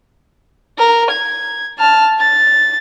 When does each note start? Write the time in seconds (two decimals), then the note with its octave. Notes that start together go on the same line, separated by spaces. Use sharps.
0.78 A#4
1.10 G#6
1.79 A5 F6
2.19 A6